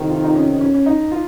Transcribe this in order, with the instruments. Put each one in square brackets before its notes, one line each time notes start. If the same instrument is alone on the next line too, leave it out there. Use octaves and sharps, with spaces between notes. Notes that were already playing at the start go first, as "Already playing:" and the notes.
Already playing: [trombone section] F2 C3 D#3
[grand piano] F4
D#4
C#4
C#4
C#4
D#4
F4